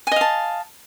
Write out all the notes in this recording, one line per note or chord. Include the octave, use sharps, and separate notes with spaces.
D#5 F5 G#5 A5